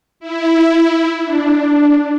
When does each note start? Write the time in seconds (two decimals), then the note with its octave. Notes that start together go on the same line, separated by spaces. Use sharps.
0.20 E4
1.25 D4